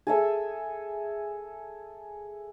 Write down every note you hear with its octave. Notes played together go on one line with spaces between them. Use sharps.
G#4 A4 E5